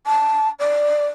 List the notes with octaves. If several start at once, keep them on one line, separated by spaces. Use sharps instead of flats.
A5
D5